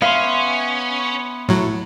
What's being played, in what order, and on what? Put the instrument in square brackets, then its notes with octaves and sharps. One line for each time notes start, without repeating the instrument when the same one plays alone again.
[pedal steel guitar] B3 E5 C6 [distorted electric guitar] C#4 [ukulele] F5
[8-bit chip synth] A2 F#3 [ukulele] E4